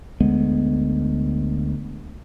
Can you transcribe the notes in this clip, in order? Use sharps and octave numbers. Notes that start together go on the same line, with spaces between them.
D2 G#3 B3